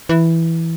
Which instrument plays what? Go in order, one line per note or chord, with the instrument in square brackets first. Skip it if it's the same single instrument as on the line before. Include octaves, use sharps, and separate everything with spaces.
[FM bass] E3